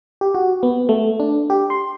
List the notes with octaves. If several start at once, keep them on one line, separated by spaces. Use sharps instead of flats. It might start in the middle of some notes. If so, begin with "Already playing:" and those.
G4
F#4
B3
A3
D4
G4
C6